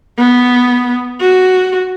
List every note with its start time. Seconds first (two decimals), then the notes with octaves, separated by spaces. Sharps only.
0.18 B3
1.21 F#4